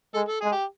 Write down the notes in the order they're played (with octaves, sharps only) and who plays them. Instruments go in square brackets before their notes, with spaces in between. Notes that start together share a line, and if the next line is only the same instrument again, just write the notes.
[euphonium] G#3 [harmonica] A4
[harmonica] A4
[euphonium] G#3 [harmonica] G#4
[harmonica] G4